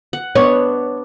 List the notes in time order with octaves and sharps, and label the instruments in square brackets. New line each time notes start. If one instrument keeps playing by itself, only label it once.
[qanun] F#5
[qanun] B3 D4 [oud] C#5